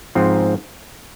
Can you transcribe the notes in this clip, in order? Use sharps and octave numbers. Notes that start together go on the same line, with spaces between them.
G#2 F3 C4